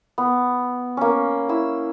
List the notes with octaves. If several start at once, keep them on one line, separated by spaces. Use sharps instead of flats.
B3
A#3 C#4
E4 E6